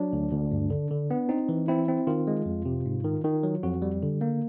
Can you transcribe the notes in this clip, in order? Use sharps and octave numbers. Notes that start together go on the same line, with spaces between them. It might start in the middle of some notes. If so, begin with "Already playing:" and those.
Already playing: F#3 D4
D2
D2
G2
D3
D3
B3
C4 D#4
E3
C4 E4
C4
D#3 F4
G#3
F2
C3
G#2
D#3
D#3
F#3
F2 F#4
G3
D3
A#3